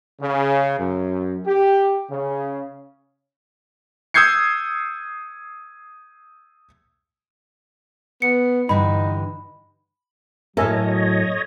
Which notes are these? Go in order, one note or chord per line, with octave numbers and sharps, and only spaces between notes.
C#3
F#2
G4
C#3
D#6 E6 G6 G#6 C7 C#7
B3 C#7
G2 D3 E3 D#4 B5
A2 F#3 A4 A#4 C#5 D#5 E5 G#5